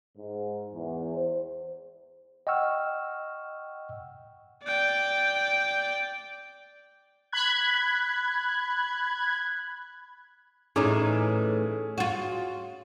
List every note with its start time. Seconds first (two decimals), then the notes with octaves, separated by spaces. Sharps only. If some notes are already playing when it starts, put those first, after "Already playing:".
0.17 G#2
0.73 E2
1.15 C5
2.47 D#5 F#5 G5 C#6 E6 F6
4.63 D5 G5
7.32 B5 F#6 G#6
10.76 A2 E3 C#4 D#4 G#4 D6
11.98 F4 F#4